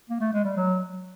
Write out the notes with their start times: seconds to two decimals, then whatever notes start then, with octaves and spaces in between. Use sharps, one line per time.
0.10 A#3
0.20 A3
0.33 G#3
0.44 G3
0.56 F#3